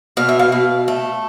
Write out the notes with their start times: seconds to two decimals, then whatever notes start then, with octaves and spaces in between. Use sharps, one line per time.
0.17 B2 F5
0.29 E5
0.39 F5
0.52 B2
0.88 A3